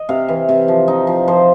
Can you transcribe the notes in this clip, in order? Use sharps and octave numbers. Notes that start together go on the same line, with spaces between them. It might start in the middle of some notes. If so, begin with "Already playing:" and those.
Already playing: D#5
C3 F5
E3
C3
F3
D#4
F3
F3 C5